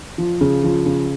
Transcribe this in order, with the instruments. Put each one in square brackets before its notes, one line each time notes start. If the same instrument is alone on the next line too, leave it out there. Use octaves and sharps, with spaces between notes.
[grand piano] F3
C#3
F3
C#3